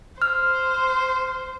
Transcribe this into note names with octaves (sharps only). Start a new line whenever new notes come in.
C5 F6